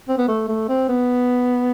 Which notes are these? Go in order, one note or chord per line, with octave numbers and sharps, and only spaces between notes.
C4
B3
A3
A3
C4
B3